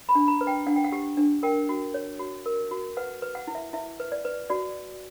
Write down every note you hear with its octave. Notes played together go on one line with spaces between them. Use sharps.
B5
D4
A#5
B4
G5
D4 F#5
G5
F#5
G4
D4
A#4 G5
F#4
C#5
F#4
A#4
F#4
B4 F#5
B4
F#5
E4
E5
E4 E5
B4
D5
B4
F#4 D5